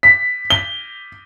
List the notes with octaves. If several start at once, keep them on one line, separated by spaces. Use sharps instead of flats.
B6
G7